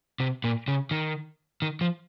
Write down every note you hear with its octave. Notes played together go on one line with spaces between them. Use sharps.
C3
A#2
C#3
D#3
D#3
F3